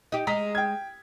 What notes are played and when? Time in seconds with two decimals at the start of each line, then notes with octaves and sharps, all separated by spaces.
0.12 D#4 G4
0.27 G#3 D#5 A#5 B6
0.55 G5 G#6